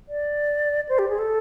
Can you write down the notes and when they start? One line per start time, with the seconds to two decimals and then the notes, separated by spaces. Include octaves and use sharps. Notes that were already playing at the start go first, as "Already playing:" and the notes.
0.09 D5
0.89 C5
0.99 G4
1.09 G#4
1.19 A4